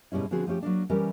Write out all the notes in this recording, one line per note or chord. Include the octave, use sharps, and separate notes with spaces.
G#2 B2 G3 C#4 E4
D3 F3 B3 C4 F#4 G#4
F3 A3 C#4 G4
F#3 A#3 D4
E3 G3 C#4 G4 A#4 E5